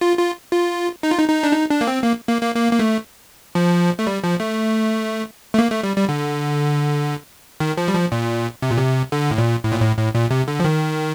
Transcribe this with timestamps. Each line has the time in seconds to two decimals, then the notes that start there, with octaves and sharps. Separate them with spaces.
0.01 F4
0.19 F4
0.52 F4
1.03 D#4
1.10 F4
1.18 D#4
1.29 D#4
1.43 D4
1.53 D#4
1.71 D4
1.81 A#3
1.87 C4
2.04 A#3
2.29 A#3
2.42 A#3
2.55 A#3
2.73 A#3
2.79 A3
3.55 F3
3.99 A3
4.07 G3
4.24 F3
4.40 A3
5.54 A3
5.59 A#3
5.72 A3
5.83 G3
5.96 G3
6.09 D3
7.60 D#3
7.77 F3
7.88 G3
7.94 F3
8.12 A#2
8.62 C3
8.70 A#2
8.78 C3
9.12 D3
9.31 A2
9.38 A#2
9.64 A2
9.72 A#2
9.80 A2
9.97 A2
10.15 A#2
10.30 C3
10.48 D3
10.60 F3
10.64 D#3